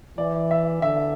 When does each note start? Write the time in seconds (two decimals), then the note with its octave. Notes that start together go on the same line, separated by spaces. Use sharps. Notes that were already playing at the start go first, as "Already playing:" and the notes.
0.18 E3 D5
0.51 E5
0.82 D3 E5